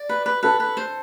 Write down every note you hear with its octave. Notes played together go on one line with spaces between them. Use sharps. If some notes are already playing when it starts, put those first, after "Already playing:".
Already playing: D5
B4
B4
A4 B4
B4
C5